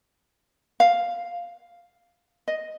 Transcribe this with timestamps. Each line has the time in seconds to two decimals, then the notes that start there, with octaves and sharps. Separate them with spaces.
0.80 F5
2.48 D#5